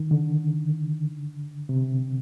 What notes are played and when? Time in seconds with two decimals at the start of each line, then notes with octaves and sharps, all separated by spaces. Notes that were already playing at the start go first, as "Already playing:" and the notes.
Already playing: D#3
0.11 D3
1.69 C3